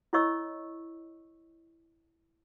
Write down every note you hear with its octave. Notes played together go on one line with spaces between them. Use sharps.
E4 A4 C#5 D#5 C#6 E6